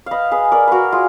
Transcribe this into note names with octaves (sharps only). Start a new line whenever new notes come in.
B4 D#5 F5
G#4 B4
A#4 D5
F#4 A#4 B4
F4 G#4